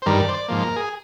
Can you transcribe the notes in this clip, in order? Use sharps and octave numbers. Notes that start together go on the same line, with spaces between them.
C5
G2 D#3 G3 A#4
D5
C5
D5
G#2 F3 A#3
A#4
G#4